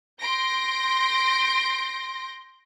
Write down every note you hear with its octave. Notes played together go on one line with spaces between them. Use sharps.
C6 G6 A#6 D7